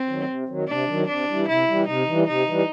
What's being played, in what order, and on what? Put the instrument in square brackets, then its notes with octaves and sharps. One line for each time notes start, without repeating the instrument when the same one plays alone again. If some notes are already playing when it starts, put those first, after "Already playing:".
Already playing: [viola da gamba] C4
[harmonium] D#3 F#3
C3
D#3 F#3
[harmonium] C3 [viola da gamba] D4
[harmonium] D#3 F#3
[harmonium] C3 [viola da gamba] D4
[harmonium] E3 G3
[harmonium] C3 [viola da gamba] E4
[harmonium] E3 G3
[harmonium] C3 [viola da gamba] D#4
[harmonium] E3 G3
[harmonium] C3 [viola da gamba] D#4
[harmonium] E3 G3